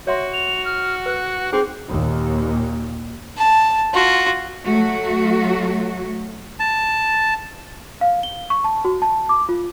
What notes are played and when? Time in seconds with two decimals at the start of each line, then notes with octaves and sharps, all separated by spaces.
0.07 F#4 C#5 E5 C6
0.33 F7
0.65 F6
1.06 B4 F#6
1.53 C4 D#4 G#4
1.89 D#2 A#2
3.38 A5
3.93 F4 F#4
4.67 F#3 A3 F#4
6.60 A5
8.01 F5
8.23 G7
8.50 C#6
8.64 A5
8.85 F#4
9.02 A5
9.29 D6
9.49 F4